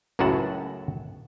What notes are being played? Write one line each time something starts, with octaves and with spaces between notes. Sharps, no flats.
C#2 F#2 A2 F#3 F#5 A5